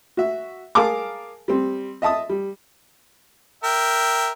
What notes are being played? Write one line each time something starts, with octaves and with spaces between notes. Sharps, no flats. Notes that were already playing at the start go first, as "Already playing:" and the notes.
F#4 E5
G#4 A#4 F5 A5 D6
G3 C4
D#5 E5 A5 D#6
G3
A#4 E5 G5